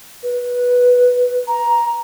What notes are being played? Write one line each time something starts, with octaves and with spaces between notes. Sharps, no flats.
B4
A#5